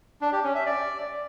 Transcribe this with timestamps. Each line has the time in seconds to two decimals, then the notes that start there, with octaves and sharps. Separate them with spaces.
0.21 D4
0.33 G4
0.44 C#4
0.55 E5
0.66 D5